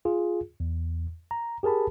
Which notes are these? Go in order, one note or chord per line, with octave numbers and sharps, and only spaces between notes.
F4 G#4
E2
A#5
G4 G#4 A#4 A5 B5